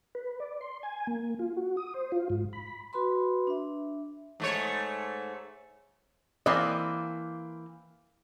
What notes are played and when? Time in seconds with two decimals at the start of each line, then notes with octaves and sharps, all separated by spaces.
0.15 B4
0.40 D5
0.61 C6
0.83 G#5
1.07 A#3
1.39 F4
1.57 F#4
1.77 D#6
1.94 C5
2.12 F4
2.30 G#2
2.53 B5
2.93 F#4 B4 B5 C6
3.47 D4 E5
4.40 G#2 A3 C#5
6.46 E3 A#3 C4 D5 D#5